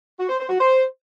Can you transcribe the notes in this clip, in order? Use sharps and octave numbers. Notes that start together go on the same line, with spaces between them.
F#4
C5
C5
F#4
C5